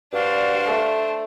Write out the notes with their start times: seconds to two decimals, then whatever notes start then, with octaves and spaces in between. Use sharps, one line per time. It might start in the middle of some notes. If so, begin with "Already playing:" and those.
0.13 G2 D4 F#4 C5 D5 F5
0.66 A3